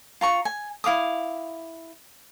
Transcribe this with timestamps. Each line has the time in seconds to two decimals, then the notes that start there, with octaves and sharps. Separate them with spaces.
0.21 F4 A#5 C#6
0.45 G#5
0.84 E4 F5 D6 D#6